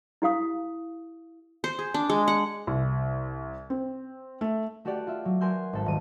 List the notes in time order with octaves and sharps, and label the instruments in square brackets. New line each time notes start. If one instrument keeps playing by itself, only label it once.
[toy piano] E4 G4 F5 D#6
[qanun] C5
G#4
D4
G#3
F#5
[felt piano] C2
C4
A3
[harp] A3 F#4 G4 A4 D5 F#5
F4 E5
F#3
A#4 F#5 G#5 C6 E6 G6
G#1 A4
D#1 D#7